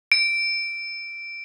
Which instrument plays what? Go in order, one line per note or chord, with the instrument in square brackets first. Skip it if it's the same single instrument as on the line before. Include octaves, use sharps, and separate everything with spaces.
[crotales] D7